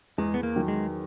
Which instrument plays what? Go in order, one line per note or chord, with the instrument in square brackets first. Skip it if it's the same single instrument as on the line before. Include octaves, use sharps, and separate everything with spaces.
[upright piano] E2 [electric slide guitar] G#3
[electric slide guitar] B3
A#3
[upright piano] D#3 F#3
[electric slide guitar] G#3